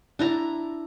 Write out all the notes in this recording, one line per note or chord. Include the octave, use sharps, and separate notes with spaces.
D4 E4 A#5